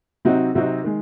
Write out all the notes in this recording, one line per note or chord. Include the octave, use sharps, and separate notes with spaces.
C3 F#3 C4 D#4 F#4
C3 F#3 C4 D#4 F#4
D#3 G#3